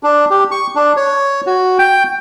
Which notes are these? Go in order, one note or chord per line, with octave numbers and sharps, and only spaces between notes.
D4
G4
C#6
D4
C#5
F#4
G5